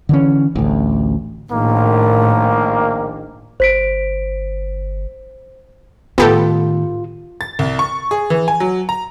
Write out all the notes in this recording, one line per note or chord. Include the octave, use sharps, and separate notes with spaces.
D3 E3 C#4
A1 D2
A#1 A2 D#3 A#3
G1 C5 B6 D7
A2 D#3 B3 F4 G4 A4
A6
C2
C#6
G#4
E3
G#5
F#3
A#5